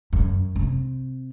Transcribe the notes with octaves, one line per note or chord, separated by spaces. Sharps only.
F#2
C3